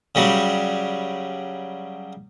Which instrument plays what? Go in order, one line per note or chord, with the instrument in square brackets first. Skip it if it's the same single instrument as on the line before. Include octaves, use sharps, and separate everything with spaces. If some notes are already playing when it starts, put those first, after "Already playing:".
[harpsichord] C#3 F#3 G3